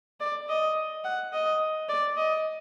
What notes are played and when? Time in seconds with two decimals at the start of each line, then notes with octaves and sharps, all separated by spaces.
0.20 D5
0.49 D#5
1.04 F#5
1.33 D#5
1.89 D5
2.17 D#5